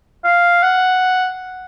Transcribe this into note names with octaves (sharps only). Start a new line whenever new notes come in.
F5
F#5